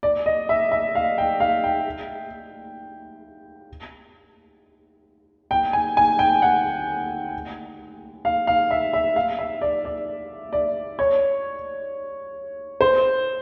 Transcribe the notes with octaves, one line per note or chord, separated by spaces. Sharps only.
D5
D#5
E5
E5
F5
G5
F5
G5
G5
G#5
G#5
G5
F#5
F5
F5
E5
E5
F5
E5
D5
D5
D5
C#5
C5